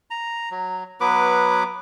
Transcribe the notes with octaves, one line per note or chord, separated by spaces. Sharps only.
A#5
F#3
F#3 B3 B4 D6